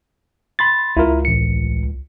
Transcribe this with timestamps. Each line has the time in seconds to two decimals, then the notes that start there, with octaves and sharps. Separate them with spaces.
0.59 B5 C6 A6
0.97 C#2 E4 F4 A#4
1.25 A1 C#7